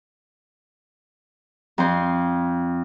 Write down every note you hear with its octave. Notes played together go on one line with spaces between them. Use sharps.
F2 C5